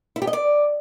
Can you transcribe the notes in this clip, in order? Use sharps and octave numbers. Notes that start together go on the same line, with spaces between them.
E4
G4
D#5
D5